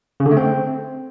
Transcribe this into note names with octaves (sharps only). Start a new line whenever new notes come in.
C#3
D3
A3
C4